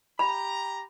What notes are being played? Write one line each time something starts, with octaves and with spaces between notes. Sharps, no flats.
G4 A#5 B5